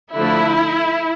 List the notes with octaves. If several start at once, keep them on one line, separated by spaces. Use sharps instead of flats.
D3 F3 A3 E4